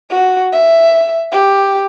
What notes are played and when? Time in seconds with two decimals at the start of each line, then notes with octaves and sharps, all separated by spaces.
0.10 F#4
0.52 E5
1.32 G4